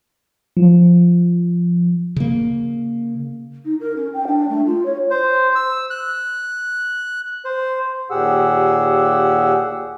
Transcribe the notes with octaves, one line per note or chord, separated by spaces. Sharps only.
F3
C#3 A#3
D#4
A#4
C#4
G5
D4
A3
F4
C#5
C5
E6
F#6
C5
D#2 A#2 G4 G#4 F#5 E6